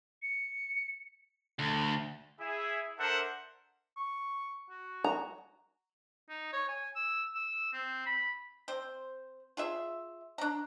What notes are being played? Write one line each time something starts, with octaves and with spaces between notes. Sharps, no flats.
C#7
D2
E4 G#4 E5
D4 A4 A#4 C5 E5 F#5
C#6
F#4
A#5
D#4
C#5
G#5
E6
E6
C4
B5
C4 C5
F4 G#4 E5
D4 A#5